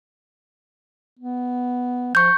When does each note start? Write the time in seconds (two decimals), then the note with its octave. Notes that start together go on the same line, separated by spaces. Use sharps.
1.19 B3
2.15 F3 C#6 G6